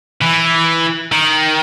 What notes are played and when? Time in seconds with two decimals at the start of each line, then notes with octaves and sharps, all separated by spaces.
0.21 E3
1.12 D#3